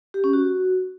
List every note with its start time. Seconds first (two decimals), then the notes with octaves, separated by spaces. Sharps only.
0.14 G4
0.24 C#4
0.33 F#4